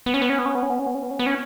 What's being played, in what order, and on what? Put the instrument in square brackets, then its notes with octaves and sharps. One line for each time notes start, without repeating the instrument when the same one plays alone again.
[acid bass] B3
C#4
B3
C#4
B3
C#4
B3
C#4
B3
C#4
B3
C#4
B3
C#4
B3
C#4